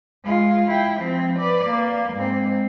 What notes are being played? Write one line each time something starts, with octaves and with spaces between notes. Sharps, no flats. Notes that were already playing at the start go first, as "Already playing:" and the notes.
G#3 F4
E4 G5
F3 C4
B4 D5
A#3
G#2 C4